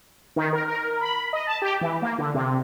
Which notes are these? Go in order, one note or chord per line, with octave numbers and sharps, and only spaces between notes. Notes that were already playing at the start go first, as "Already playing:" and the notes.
D#3
A#4
A#4
B5
D#5
A5
G4
E3
A#3
D3
C3